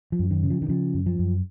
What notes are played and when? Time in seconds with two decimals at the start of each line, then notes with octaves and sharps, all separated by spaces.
0.12 F3
0.19 F#2
0.31 D#3
0.43 C#3
0.50 F3
0.62 D#3
0.68 C#3 F3
0.94 F#2
1.06 F3
1.19 F#2